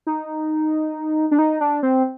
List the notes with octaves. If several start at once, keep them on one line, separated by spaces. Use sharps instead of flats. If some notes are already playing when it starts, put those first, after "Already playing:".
D#4
D4
D#4
D4
C4